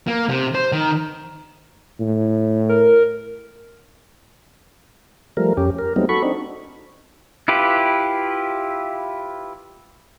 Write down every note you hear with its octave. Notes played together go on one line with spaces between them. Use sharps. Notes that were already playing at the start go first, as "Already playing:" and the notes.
A#3
C3
C5
D#3
A2
A#4
F3 G3 A3 A#4
F2 C#4 G4
A#4
F#3 G3 A3 B3 C4 D#4
F#4 A4 B5 C#6
C4 D4 D#4
E4 F4 G4 B4